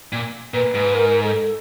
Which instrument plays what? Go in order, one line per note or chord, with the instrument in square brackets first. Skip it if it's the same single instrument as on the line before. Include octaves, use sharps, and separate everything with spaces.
[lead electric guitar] A#2
[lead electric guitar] A#2 [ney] B4
[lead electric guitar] G#2
[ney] A#4
A4